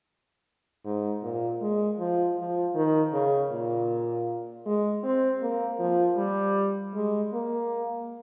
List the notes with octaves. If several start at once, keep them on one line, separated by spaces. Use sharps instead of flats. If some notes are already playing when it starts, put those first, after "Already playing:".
G#2
A#2
G#3
F3
F3
D#3
C#3
A#2
G#3
C4
A#3
F3
G3
G#3
A#3